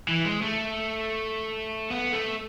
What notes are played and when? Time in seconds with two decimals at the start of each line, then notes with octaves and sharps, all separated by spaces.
0.09 E3
0.25 G#3
0.42 A3
1.91 B3
2.13 A3